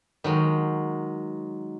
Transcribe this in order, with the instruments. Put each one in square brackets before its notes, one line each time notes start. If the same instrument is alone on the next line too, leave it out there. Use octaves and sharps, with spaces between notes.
[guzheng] D#3 F#3 G#3